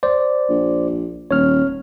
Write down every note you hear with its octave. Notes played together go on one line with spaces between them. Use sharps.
C5 D5
A#1
D#1 C#5 F6